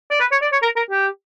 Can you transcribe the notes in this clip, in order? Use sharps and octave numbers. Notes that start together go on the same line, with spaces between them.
D5
B4
C#5
D5
C#5
A#4
A#4
G4